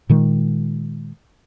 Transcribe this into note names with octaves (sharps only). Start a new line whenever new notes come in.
A#2 D#3 G#3